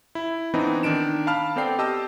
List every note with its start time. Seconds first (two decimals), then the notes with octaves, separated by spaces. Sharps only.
0.15 E4
0.54 E3 B3 C4 D4 D#4
0.83 D#3 D4 D7 E7
1.27 F5 A5 B5 F6
1.56 B3 C4 A4 D5 G5 C7
1.79 G4 D#5 A5 E6